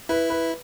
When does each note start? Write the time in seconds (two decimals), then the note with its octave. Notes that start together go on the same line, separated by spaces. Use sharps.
0.09 E4 B4
0.30 B4